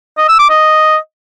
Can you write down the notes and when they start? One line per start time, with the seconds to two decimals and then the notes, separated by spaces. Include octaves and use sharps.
0.18 D#5
0.28 E6
0.39 D6
0.50 D#5